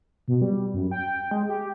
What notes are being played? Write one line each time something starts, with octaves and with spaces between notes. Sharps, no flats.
B2
G3
F#2
G5
G#3
G4